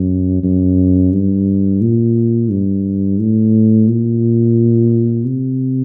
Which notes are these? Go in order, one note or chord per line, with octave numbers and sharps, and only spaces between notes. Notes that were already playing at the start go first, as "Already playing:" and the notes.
Already playing: F#2
F#2
G2
A#2
G2
A2
A#2
C3